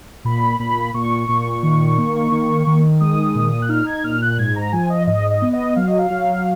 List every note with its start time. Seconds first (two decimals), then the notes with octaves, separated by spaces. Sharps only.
0.25 A#2 B5
0.59 A#2 B5
0.94 A#2 C#6
1.29 A#2
1.63 D#3
1.98 A#3
2.32 D#3
2.67 D#3
3.00 G#3 D#6
3.35 A#2
3.62 F#6
3.69 D#4 F6
3.87 G#6
4.04 A#2 F6
4.22 F#6
4.38 G#2 G#6
4.56 A#5
4.72 F3 G#5
4.90 D#5
5.07 G#2 D#5
5.30 D#5
5.42 B3
5.53 D#5
5.76 F#3 F5
5.87 D#5
5.99 F5
6.10 F#3